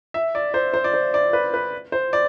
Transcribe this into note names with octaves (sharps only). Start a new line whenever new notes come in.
E5
D5
C5
C5
D5
C5
D5
B4
B4
C5
D5